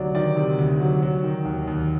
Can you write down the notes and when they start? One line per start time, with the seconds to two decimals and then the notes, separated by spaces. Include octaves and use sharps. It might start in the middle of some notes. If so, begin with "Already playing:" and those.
Already playing: D2 C3 D#3 F#3 D5
0.15 D#3 D5
0.36 C3
0.58 D2
0.81 F#3
1.02 F#3
1.24 D#3
1.45 D#2
1.67 D#2